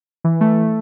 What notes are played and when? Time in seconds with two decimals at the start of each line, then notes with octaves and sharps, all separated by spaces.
0.24 E3
0.41 A3